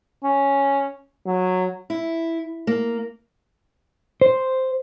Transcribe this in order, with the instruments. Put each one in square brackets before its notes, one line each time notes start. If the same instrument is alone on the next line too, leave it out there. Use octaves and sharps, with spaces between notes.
[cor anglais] C#4
[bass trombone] F#3
[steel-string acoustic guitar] E4
A#3
[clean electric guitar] C5